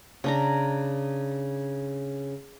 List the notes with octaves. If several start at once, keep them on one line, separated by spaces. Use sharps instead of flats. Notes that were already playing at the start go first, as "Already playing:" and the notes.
C#3 D4 A#5